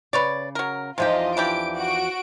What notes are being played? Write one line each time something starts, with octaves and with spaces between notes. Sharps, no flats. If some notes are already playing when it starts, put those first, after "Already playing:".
C#3 B4 C#5 D5
F#3 A#4
E2 C3 F3 G#3 D#4 F4 G4 D#5
E3 D4 G4 D7
F#4 F#5 D7